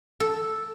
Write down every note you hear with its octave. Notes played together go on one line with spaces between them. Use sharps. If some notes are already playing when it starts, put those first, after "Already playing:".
A4